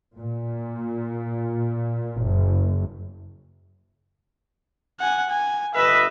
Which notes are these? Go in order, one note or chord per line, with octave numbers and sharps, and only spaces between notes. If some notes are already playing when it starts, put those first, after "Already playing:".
A#2
F#1
F#5 G#5
G#5
G1 B4 D#5 E5